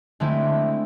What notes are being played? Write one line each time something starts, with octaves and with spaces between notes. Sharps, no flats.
D3 G#3 A3 C4 E4